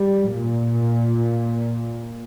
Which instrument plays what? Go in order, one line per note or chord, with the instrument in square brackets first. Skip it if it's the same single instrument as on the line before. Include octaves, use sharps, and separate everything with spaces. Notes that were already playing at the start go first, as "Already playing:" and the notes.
Already playing: [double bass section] G3
A#2